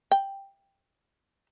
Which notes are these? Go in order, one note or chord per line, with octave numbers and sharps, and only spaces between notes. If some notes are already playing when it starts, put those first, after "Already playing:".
G5